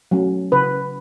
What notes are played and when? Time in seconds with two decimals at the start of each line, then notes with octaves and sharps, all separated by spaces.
0.11 F#3 A3 C#4
0.52 C#3 B4